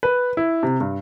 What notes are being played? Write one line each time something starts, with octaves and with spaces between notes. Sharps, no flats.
B4
E4
C3
G2